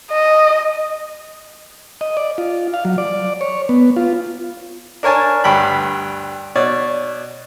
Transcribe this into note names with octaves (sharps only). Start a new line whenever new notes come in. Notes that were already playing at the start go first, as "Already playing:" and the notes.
D#5
D#5
D5
F4
F5
F#3
D5
C#5
B3
F4
D4 A#4 C#5 G#5 A5
D2 G2 G5 B5
B2 C#5 D5